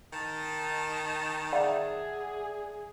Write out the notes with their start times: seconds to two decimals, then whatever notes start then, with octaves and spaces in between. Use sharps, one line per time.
0.13 D#3 D#5 A5
1.52 G#4 D5 E5 F#5